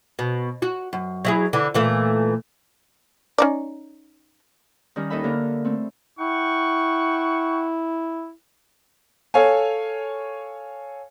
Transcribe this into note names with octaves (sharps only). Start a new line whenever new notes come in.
B2
F#4
F#2
F#3 E4 G#4
D3 E3
A#2 E3 A3
C#4 D#4 D5
D#3 G3 C#4 A#4
D#2 D#4 A4 D#5 E5 B5
D3 A#3 A#4
A3 C4
E4 F#5 G5 C#6
A4 C#5 F5 G#5